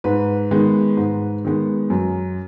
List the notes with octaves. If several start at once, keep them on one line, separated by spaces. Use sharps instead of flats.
G#2 B4
D#3 G#3 B3
G#2
D#3 G#3 B3
F#2